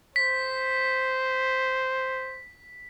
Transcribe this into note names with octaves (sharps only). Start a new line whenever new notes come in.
C5 B6